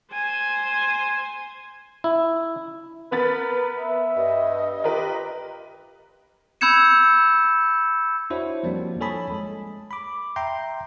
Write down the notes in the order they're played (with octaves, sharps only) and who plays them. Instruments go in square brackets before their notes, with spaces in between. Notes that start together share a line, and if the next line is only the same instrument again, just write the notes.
[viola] C5 G#5
[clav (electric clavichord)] E4
[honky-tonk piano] B3 B5 A6 [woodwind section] A#4 B4
[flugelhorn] E5
[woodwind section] G2 [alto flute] D#5
[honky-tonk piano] F4 A#4 B4 [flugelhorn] G4
[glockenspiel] B5 E6 G6 G#6 C#7 E7
[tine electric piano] D4 E4 F#4 C5 C#5
F3 G3 A#3 C4 D4
A4 C#5 G#5 A5 B5 D#6
G#3
B5 D6
E5 G5 A#5 C6